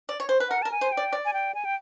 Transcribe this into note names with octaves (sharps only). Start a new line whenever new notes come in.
D5
C#5
C5
B4
A#4 F#5
A#4 A5
G#5
C5
G5
D5
D5
G#5
G5
G#5
G5